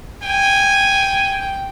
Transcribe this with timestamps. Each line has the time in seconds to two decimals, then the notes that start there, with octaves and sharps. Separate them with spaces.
0.22 G5 G#5